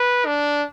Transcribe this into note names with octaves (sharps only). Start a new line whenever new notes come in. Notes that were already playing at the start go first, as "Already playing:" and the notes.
Already playing: B4
D4